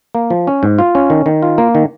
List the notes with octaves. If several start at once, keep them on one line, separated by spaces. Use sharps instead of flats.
A#3
F3
C#4
G#2
F4
C#4
D#3
D#3
F4
A#3
D#3